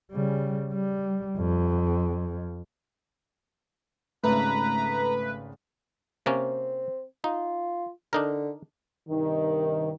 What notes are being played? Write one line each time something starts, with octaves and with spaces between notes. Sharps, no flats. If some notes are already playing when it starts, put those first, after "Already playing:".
C#3 G3
G3
F2
G#1 C#3 A3 B4 A#5
C3 A#3 C4 C#4
D#4 F4
D3 D4 D#4 A#4
G2 C3 D#3